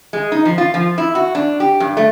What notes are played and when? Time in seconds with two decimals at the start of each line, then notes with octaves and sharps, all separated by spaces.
0.13 G#3
0.32 D#4
0.45 F3
0.58 F4
0.74 F3
0.98 E4
1.15 F#4
1.35 D4
1.60 G4
1.80 G2
1.97 A3